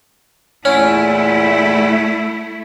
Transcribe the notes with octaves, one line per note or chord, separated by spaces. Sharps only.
E2 A#2 A3 C#4 E4 F#5